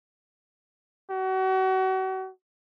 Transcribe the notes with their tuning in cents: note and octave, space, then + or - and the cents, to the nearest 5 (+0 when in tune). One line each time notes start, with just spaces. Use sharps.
F#4 +35